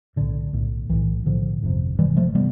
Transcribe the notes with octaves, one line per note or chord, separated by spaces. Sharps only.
B1 A2 D3
B1 A2
B1 A2 E3
B1 A2 D3 F3
G1 F2 C3
G1 F2 C3 E3 G3
F3 A3
C3 G3 B3